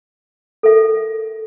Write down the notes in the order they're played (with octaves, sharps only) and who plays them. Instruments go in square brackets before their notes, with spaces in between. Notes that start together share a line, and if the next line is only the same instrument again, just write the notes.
[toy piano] A4 A#4 E5